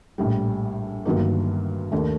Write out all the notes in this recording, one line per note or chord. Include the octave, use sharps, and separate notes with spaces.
A#1 A2 G3
G1 G2 D#3 F#3 A#3
D#2 D#3 A3 D4